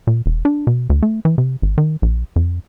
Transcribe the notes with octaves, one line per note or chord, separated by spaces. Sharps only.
A#2
E1
D4
B2
D2
A3
E3
C3
G#1
D#3
A#1
F2